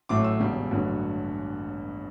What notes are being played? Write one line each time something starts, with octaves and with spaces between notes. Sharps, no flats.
A1 A2 F#3 A3 D6
E6
E1 E2 C#3 G3
A1 G2 D3 F#3